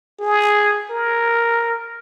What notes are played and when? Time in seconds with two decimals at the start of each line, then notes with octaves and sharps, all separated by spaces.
0.21 G#4
0.91 A#4